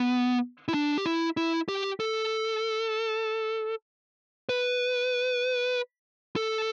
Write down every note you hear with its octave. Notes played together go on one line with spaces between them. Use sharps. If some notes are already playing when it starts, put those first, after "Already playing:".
Already playing: B3
E4
D4
G4
E4
E4
G4
A4
B4
A4